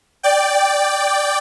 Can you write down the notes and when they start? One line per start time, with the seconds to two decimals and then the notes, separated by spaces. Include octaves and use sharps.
0.23 D5 G5